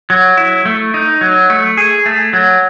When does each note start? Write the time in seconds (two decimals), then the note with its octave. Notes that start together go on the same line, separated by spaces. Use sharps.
0.10 F#3
0.37 E4
0.66 A3
0.94 D#4
1.21 F#3
1.50 A3
1.77 G#4
2.06 A3
2.33 F#3